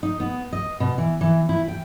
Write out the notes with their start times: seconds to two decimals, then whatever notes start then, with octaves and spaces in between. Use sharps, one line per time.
0.03 D#4
0.20 B3
0.53 D#5
0.80 B2
0.98 E3
1.21 E3
1.49 E4
1.68 G5